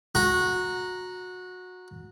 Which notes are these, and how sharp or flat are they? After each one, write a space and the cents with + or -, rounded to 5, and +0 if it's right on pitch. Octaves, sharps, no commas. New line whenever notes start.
F#4 -20 A#5 +0